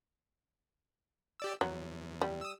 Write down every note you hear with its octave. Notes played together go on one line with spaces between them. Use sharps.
G4 D5 E6
E2 F#3
G3
D#6 E6